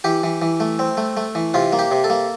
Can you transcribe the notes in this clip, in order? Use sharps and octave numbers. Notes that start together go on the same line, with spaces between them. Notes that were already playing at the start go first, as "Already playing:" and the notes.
E3 G4
E3
E3
A3
C4
A3
A3
E3
C3 F4
A#3
G4
C3
A4
A#3